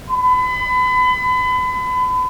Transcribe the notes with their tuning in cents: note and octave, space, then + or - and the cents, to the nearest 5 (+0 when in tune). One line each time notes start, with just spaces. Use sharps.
B5 +35